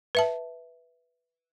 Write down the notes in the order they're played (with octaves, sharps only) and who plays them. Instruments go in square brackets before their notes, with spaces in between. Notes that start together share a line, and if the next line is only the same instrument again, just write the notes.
[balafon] B4 E5 A5